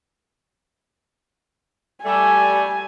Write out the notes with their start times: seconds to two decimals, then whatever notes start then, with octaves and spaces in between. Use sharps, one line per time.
2.05 G3 A3 G#5